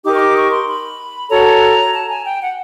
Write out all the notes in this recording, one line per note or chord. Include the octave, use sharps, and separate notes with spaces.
D#4 G4 A#4 D6
C#6
D6
C#6
C6
B5
F#4 A4 C#5 A#5
A5
G#5
G5
F#5